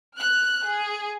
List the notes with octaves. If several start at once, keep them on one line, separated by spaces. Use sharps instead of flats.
F6 F#6
G#4